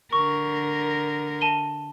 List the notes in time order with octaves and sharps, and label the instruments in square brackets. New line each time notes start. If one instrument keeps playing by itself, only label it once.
[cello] D3 A#4 [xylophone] C#6
[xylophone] A5 D#7 G7